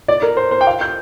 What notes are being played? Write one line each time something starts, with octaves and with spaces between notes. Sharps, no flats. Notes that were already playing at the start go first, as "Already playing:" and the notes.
D5
A#4
C5
C5
G5
F5
G6